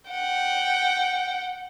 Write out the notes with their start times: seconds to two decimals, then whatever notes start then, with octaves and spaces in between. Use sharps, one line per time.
0.10 F#5 G5